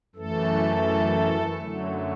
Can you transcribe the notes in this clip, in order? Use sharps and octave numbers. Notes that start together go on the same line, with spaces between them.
F#2 E3 A3 A4
F#2 D3 F#3 A3